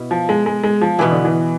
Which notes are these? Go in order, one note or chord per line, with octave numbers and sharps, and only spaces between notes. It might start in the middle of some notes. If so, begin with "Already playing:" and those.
Already playing: B2 B3 E4
F3
G#3
G#3
G#3
F3
B2 E3 B3 E4
D3
E3